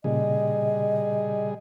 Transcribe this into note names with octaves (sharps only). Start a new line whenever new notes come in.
A#2 C#3 G3 G#4 D#5